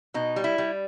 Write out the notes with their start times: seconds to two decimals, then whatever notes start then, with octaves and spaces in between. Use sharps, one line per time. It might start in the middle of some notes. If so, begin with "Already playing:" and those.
0.14 B2 D#4
0.36 G3
0.44 E4
0.58 G3